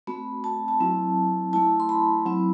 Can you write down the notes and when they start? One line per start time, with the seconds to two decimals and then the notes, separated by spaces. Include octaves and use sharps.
0.07 A3 C4 F#4 B5
0.44 A5
0.68 A5
0.80 F#3 C4 E4
1.53 A3 E4 A5
1.80 C6
1.89 B5
2.26 F#3 C4 E4